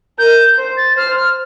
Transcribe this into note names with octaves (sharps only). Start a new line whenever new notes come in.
A#4 G6
C5
A6
C5 F6
F6